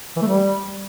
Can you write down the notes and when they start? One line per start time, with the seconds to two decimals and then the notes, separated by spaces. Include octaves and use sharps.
0.16 E3
0.22 A3
0.27 G3